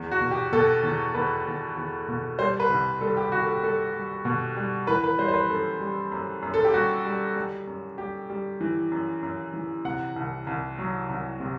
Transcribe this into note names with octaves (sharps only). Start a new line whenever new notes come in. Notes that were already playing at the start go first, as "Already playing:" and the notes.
Already playing: E2
F#4
B2
G4
B2 A4
E2
E2 B4
E2
E2
B2
G3 C5
B4
C2
G3 A4
G4
C2 F#4
A4
G4
G3 A4
G3
B2
G3
E3 B4
B4
G3 C5
C5
B4
F#2 A4
G3
F#2
F#2
A4
G4
G3 F#4
G3
G3
F#2
G3 G4
G3
E3
F#2
F#2
E3
C3 F#5
C2
C2
F#3
C2
C3